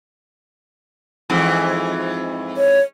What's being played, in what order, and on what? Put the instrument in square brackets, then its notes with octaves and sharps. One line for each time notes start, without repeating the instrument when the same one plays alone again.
[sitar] F2 G#2 E3
[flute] C#5